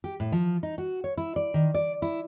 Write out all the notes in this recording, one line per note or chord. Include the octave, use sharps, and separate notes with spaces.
G4
A2
F3
D#4
F#4
C#5
E4
D5
D#3
D5
E4